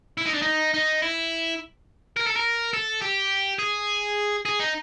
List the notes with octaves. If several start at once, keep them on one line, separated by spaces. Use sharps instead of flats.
E4
D#4
D4
D#4
D#4
E4
A#4
A4
A#4
A4
G4
G#4
G#4
D#4